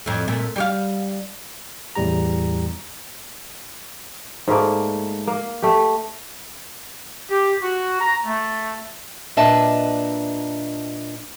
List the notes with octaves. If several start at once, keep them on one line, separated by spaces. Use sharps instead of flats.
F2 A2
A#2 A3
G3 G4 F5
E2 A2 G3 G4 A#5
G#2 A3 A#3 D5
A#3
A3 G4
G4
F#4
A#5
A3
A#2 D4 B4 D#5 E5 A5